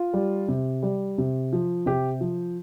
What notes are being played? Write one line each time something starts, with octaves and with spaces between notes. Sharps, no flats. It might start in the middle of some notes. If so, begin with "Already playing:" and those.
Already playing: F4
G3
C3
G3
C3
F3
C3 G4
F3